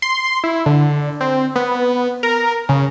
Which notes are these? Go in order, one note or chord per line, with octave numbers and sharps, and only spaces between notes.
C6
E4
D3
C4
B3
A#4
C#3